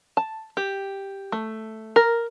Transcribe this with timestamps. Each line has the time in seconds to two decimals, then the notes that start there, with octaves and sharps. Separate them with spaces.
0.17 A5
0.57 G4
1.32 A3
1.96 A#4